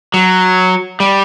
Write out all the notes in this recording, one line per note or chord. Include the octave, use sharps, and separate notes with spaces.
F#3
G3